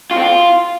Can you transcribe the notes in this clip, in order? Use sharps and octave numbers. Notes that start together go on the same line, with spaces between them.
F4
C4
F4